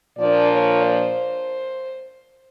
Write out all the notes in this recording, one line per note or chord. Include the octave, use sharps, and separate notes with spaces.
A#2 F3 A#3 D4 D5
C#5
C5